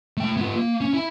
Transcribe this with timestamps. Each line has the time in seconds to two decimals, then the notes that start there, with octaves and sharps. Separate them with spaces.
0.17 A3 G5
0.37 B3 F4
0.56 A#3
0.81 C#4
0.94 E4